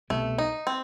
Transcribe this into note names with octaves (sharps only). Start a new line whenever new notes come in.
C2 B2 G3 A3
D#4
C4